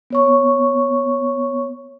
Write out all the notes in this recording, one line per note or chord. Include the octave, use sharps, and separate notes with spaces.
B3 C#5 C#6